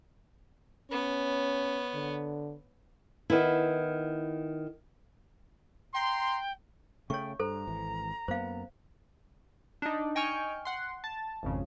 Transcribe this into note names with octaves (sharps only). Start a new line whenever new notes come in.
B3 C#4 C#5
D3
D#3 B3 E4
G5 A#5 C6
C#3 A3 C#5 G5 C#6
G2 A4 C5 A#5
G#1 E3
F#2 A#3 B3 C5 F5
D4 D#4
D#5 G5 G#5 C#6 F6
F#5 C6
A5
G#1 F2 C#3